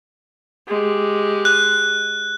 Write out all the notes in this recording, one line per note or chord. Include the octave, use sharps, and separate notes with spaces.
G#3 G4
F#6